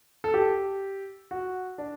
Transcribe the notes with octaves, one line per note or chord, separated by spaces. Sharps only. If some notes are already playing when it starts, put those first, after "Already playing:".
A4
G4
F#4
D4